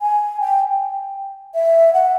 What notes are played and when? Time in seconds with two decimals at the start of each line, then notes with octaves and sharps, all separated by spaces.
0.01 G#5
0.40 G5
1.54 E5
1.93 F#5